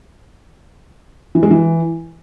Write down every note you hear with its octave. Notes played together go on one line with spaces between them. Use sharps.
E3
G#3
E3